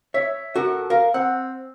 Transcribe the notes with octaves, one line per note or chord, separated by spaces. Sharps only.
C#5 E5
F#4 A4 A#4
A#4 F5
C4 F#5